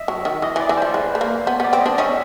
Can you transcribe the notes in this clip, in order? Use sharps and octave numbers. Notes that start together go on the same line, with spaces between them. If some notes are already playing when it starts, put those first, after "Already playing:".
Already playing: D#5 E5
F#3
D#3
E3 D#5
E3
D5
E3
C5
F3
G#3 B4
A3
A#3
B3 C5
B3
D5
C4
D#5
C4 D4
C#4 D#4 E5